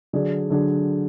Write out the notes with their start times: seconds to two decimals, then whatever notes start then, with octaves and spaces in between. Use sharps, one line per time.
0.13 D3 F#3 D4 G#4
0.50 D3 F#3 D4 G#4